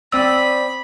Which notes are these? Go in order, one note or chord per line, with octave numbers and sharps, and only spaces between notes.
C4 D5 B5 D#6 E6